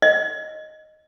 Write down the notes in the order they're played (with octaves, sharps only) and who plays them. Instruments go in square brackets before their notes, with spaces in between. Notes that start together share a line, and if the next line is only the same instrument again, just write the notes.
[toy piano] D#5